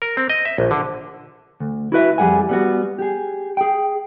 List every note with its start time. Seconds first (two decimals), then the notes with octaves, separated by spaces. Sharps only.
0.02 A#4
0.17 C4
0.29 D#5
0.45 E5
0.58 A#1
0.71 D3
1.60 D2
1.92 E4 F#4 B4 E5
2.18 F2 G3 G#4 F#5 G#5
2.49 G3 B3 F#4
2.99 G4 G#4
3.57 G#4 G5